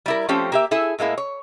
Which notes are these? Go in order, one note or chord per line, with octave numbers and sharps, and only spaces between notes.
G3 E4 A#4
F3 A3 C4 C#4 G4
A#3 G4 E5
E4 G#4 A4
A2 G#3 A#3 E4
C#5